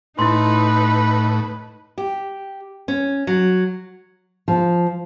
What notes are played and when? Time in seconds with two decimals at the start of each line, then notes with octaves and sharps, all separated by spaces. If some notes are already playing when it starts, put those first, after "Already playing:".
0.19 A2 D#4 E4 B4 C6
1.98 G4
2.88 C#4
3.27 F#3
4.48 F3